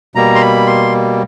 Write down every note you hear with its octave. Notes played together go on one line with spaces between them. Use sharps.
B2 G3 A#3 A#5
C6
B5
C6